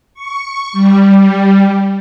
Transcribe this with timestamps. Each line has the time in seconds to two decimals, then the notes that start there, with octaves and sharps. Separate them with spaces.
0.14 C#6
0.73 G3